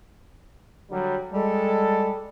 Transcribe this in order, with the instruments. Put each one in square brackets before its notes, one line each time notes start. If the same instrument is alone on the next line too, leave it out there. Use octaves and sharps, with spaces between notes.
[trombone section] D3 F#3 G3
[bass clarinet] G3 [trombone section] G#3 A4